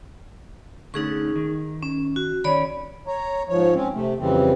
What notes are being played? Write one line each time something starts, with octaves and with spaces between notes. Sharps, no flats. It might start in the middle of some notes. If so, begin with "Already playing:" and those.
D3 A3 C#4 D#4 G#4 C#6
D#3
C#4
F#4
D#3 C#4 C#5 D5 B5
C#5 A#5
G#2 F3 C#5
C4 C#4
C3 A3
F2 C#3 E3 G3 C4